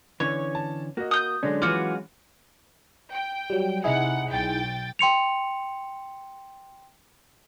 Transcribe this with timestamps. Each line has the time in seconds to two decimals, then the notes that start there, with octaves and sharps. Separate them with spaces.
0.20 D3 E3 C#4 C#5 C#6
0.55 A5
0.97 A#3 F#4 D#5
1.11 D#6 G6
1.43 D3 F#3 G#3 C#4 D4
1.62 E3 F4 F#4 D6
3.12 G5
3.50 F#3 G3
3.84 C3 D#4 E4 G#4 F#5
4.31 B1 G5 A6
4.99 G5 C6 C#7 F7